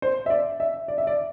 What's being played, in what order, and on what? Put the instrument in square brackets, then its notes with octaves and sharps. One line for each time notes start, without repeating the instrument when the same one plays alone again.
[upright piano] C5
E5
D5
E5
D5
E5
D5